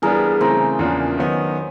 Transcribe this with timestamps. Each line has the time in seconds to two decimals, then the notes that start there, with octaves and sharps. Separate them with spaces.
0.02 E3 G3 B3 D4 G#4 A#4
0.41 C#3 E3 A3 C4 A#4 C5
0.79 E2 C#3 F3 A#3 D4
1.18 D#3 F#3 B3 D#4